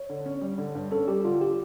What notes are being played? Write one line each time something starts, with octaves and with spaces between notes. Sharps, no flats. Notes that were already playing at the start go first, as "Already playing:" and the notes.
Already playing: C#5
D3
C#4
G3
D3
G2
C#4 A4
G3 G4
D3 F4
G4